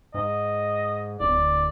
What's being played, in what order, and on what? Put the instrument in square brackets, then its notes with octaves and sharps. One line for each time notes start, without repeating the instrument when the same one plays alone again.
[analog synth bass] G#2 [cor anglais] D#5
[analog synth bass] D1 [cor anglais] D5